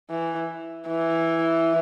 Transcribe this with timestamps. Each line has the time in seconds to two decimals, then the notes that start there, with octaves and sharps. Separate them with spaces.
0.10 E3
0.88 E3